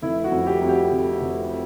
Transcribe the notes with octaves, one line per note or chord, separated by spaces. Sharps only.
F1 E4
F#4
F2
G4
F2 F#4
G4
F1
F1